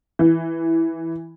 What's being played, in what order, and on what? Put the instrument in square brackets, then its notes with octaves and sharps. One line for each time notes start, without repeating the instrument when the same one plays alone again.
[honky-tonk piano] E3